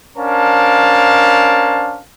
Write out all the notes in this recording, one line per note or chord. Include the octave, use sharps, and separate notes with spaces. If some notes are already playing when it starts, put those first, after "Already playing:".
C#4 D4 A#4 C5 F5 A5